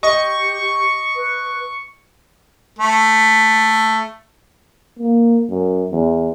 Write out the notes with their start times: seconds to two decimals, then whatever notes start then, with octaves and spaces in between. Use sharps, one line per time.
0.03 G4 D#5 C#6
1.16 B4
2.79 A3
4.99 A#3
5.50 F#2
5.91 E2